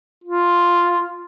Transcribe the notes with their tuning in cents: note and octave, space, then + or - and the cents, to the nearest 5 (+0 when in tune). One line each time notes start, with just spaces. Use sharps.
F4 +0